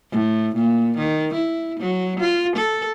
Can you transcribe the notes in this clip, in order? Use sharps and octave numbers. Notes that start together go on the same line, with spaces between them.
A2
A#2
D#3
E4
F#3
F4
A4